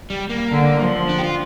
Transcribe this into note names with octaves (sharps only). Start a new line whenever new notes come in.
G3
A#3
D3
F3
D4
G4
F4